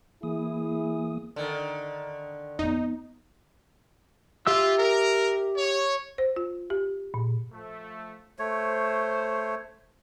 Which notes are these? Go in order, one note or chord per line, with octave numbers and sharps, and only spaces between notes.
E3 A#3 E4 G#4 D#6
D3 D#3
F2 B3 D#4
F4 G4 E5 E6
A#4
C#5
C5
F4
G4
A#2
F3 A3
A3 C5 C#5